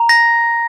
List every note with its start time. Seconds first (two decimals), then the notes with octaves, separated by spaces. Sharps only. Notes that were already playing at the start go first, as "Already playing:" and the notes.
Already playing: A#5
0.09 A#6